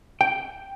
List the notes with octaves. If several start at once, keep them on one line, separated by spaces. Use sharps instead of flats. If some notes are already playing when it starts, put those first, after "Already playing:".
G5